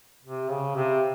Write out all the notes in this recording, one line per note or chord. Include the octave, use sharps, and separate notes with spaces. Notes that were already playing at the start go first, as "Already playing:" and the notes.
C3
C#3
C3